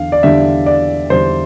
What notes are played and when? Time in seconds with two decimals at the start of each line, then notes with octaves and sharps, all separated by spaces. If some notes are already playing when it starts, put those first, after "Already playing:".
Already playing: E2 D3 F5
0.12 D5
0.23 E2 D3 G3 D4 E5
0.66 D5
1.10 E2 D3 G3 D4 C5